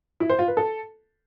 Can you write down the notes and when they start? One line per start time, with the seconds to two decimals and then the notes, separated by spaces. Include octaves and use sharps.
0.20 E4
0.29 C5
0.39 F4
0.48 B4
0.57 A4